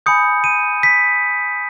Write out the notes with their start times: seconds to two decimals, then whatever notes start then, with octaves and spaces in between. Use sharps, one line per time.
0.06 G#5 B5 D#6 G6 C#7
0.44 D#7
0.83 B6